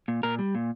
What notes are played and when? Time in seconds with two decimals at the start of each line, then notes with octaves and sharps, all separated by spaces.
0.08 A#2
0.23 A#2 A#4
0.39 G3
0.55 A#2